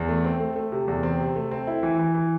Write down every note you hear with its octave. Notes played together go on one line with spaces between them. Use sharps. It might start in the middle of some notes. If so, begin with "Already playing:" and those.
Already playing: E2
A3
C4
A3
A3
C3
E2
C4
C3
A3
C4
E4
E3
E3
E3